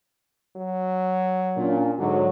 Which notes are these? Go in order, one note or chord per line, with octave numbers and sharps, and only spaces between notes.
F#3
A#2 C#4 D4
G#2 D3 F#3